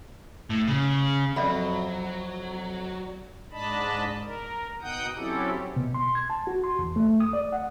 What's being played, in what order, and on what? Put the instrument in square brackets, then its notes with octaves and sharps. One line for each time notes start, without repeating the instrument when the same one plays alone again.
[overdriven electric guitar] A2
C#3
[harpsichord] F2 [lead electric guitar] F#3 [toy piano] D5 E5 B5
[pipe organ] G#2 D4 D#5 A5 B5
A#4
B2 D#4 F#5 G5 D#6 G6
F#3 C4 C#4 E4 G4 A4
[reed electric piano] B2
C6
G#6
A5
F#4
C6
E2
A3
D#6
D5
F#5